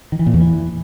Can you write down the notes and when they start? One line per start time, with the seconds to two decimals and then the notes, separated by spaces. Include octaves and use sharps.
0.12 D#3
0.19 E3
0.27 A#2
0.34 E2
0.41 E3